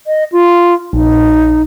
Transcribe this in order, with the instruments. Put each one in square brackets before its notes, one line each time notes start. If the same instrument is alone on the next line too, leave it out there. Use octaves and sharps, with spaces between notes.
[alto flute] D#5
F4
[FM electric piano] A#1 [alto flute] D#4